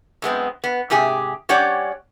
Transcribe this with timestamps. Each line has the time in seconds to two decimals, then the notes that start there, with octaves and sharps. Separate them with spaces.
0.22 F#2 G#3 B3 C4
0.64 B3
0.90 G#2 C3 G4 G#4
1.49 G3 C#4 G4 C#5 D5 F#5